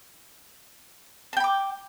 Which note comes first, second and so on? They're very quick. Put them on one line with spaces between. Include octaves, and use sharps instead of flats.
A5 G5 B5 D6